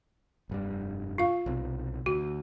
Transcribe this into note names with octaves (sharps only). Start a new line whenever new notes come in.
F1 G2 G3
F4 F5
B1 C3
D2 F#4